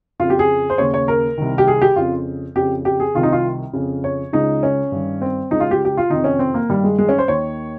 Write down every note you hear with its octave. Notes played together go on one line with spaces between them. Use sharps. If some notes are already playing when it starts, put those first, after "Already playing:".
F2 C#3 F4
G4
G#4
C5
D#2 C#3 C#5
C#5
A#4
C2 C3 D#3
G4
G#4
G4
F2 C#3 F4
F2 C#3 G4
G4
G#4
C2 C3 D#3 F4
D#4
F4
F2 C#3
C#5
C#2 C#3 D#4
C#4
G2 D#3
C4
C#2 C#3 D#4
F4
G4
G4
F4
F2 C3 D#3 D#4
C#4
C4
A#3
G2 D#3 G3
G#3
G#3
C#4
C5
D#2 D#3 C#5